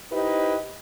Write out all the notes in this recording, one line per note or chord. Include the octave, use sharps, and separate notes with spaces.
D#4 E4 G4 B4 C5 D#5